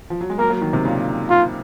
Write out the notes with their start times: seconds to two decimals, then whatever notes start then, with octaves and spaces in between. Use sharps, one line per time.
0.10 F3
0.21 F#3
0.30 G#3
0.39 F#3 A#3 A#4
0.50 F#3 A#3
0.61 D#3 F#3
0.73 C3 D#3
0.85 A#2 C#3
1.30 F4